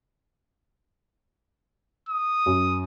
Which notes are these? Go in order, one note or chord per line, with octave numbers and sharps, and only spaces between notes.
D#6
F#2